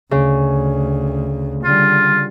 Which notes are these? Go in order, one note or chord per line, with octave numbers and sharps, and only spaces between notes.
D2 C#3
D3 G3 F4